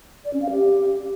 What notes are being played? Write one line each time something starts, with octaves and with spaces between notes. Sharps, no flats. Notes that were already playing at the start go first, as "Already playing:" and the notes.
D5
C#4
F5
G4